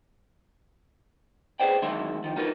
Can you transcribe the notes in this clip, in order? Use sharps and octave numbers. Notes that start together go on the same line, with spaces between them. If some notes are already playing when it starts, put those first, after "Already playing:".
G#4 B4 C5 D5 G5
F#2 D#3 E3 G#3 E5 C6
D#3 F3
D#4 F4 A#4 B4